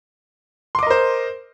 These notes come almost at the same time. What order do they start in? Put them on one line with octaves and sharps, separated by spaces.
C6 D6 D#5 A#4 C5